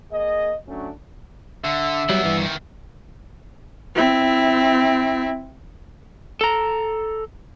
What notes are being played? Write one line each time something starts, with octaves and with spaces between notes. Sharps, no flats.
A#3 G#4 D#5
F#3 A3 C#4 D4
D3 E5
F#3 G3 B3 E4
G2 E3
D#3 E4
C4 E4
A4 A#5